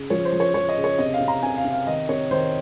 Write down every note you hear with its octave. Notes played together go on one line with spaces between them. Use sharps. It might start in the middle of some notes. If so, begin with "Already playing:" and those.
Already playing: C#3
F3 C#5
C5
F3
C#5
F3 C#5
D#5
C#3
C#5
C3 D#5
F5
C3
A#5
C3 G#5
F5
C3
F5
D#3 D#5
C3 C#5
D#3 C5